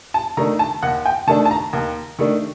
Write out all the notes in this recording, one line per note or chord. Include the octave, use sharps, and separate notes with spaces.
A5
D#3 A3 D4 A#5
A5
D#2 F#5
G5
D#3 A3 D4 A5
A5
A#5
D#2
D#3 A3 D4